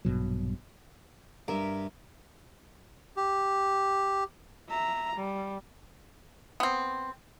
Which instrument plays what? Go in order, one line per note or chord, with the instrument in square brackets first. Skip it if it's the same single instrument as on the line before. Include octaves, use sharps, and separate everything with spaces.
[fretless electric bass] A#1 G2 B2 F#3
[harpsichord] G2 [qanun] A#4 E5
[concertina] G4
[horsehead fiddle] E5 A#5
G3
[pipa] B3 C4